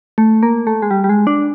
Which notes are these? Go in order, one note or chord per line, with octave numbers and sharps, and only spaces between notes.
A3
A#3
A3
G#3
G3
G3
G#3
D4